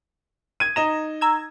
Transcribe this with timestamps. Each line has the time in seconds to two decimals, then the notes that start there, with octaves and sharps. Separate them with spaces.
0.60 G#6 D#7
0.76 D#4 D#5 A#5 E7
1.21 A#5 E6 G#6